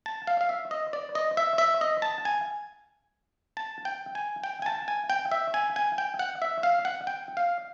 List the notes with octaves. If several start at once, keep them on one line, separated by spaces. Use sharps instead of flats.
A5
F5
F5
E5
D#5
D5
D#5
E5
E5
D#5
A5
G#5
A5
G5
G#5
G5
G#5
A5
G#5
G5
E5
G#5
G#5
G5
F#5
E5
F5
F#5
G5
F5